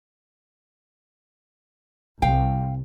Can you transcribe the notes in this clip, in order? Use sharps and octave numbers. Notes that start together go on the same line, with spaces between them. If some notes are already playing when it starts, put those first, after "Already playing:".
C2 C3 F5 G5